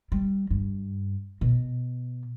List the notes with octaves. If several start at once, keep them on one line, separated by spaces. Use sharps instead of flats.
G3
G2
B2